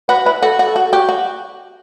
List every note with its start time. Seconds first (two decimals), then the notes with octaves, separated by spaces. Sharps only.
0.09 F#4 B4
0.26 E4 B4
0.43 F#4 A4
0.59 F#4
0.68 A4
0.76 F#4
0.92 F#4 G4
1.09 F#4